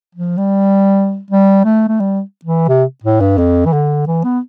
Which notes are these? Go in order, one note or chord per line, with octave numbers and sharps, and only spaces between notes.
F3
G3
G3
A3
A3
G3
E3
C3
A2
G2
F2
E3
D3
E3
B3